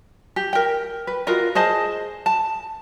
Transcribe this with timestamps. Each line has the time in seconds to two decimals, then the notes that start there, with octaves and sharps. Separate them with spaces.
0.36 G4
0.53 A#4 G5
1.07 B4
1.27 F4 F#4 A#4 D#5
1.55 G#4 C5 D#5 A5
2.26 A5